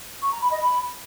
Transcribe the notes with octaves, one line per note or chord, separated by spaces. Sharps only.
C#6
A#5
B5
D#5
B5